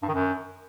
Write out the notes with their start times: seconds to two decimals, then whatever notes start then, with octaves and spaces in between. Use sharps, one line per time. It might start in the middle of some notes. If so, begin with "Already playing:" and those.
0.03 G2
0.08 D#3
0.14 F#2